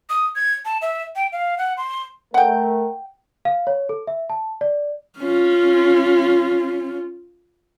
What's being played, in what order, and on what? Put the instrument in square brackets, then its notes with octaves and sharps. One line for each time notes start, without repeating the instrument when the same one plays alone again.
[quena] D#6
G#6
A5
E5
G5
F5
F#5
C6
[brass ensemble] A3 A#4 [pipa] F#5 G5
[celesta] F5
C#5
A4
E5
A5
D5
[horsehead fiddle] C#4 F4